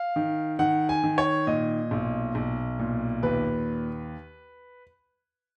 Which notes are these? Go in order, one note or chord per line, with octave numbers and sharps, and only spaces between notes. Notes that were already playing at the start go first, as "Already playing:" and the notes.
Already playing: F5
D#3
D#3 F#5
G#5
D#3
C#5
A#2 D#5
B1
B1
A#2
D#2 B4